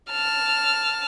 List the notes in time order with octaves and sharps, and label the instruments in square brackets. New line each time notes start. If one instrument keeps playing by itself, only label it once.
[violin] A5 F6